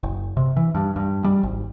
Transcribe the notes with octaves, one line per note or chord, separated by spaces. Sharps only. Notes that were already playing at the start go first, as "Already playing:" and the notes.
F#1
C3
E3
G2
G2
G3
G#1